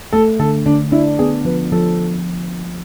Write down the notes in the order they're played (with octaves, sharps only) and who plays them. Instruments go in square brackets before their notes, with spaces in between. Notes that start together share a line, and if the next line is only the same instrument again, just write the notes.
[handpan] A3 [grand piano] A4
[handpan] D3 [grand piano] A4
[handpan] D3 [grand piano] D4
[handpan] D4 [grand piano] E4
[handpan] B3 [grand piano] G#4
[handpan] F3 [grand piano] B4
[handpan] F3 [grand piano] A4